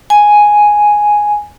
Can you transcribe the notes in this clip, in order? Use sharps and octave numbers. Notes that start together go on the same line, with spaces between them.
G#5